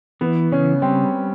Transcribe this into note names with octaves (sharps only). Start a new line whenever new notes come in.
E3 B3
C#3 C#4
G3 C4